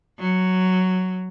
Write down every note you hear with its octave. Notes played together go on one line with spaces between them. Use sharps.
F#3